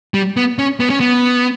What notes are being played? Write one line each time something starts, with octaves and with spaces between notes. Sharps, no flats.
G3
B3
C#4
B3
C#4
B3